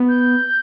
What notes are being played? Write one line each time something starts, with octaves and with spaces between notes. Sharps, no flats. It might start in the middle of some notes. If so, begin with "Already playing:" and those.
Already playing: B3
G6